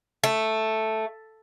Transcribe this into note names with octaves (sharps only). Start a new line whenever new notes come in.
A3